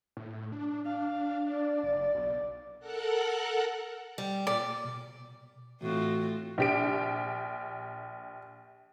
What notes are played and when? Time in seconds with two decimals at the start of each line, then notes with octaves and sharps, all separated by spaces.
0.17 A2
0.52 D4
0.85 D4 F5
1.51 D5
1.83 F#1
2.15 B1
2.80 A4 A#4 F#5 F#6
4.18 G3
4.47 A#2 D5
4.85 B2
5.81 A2 E3 C4 F4 F#4
6.58 A#1 G4 D7